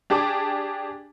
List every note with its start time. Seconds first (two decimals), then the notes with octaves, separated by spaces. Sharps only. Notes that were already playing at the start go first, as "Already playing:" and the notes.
0.10 D4 G4 G#4 A5 D6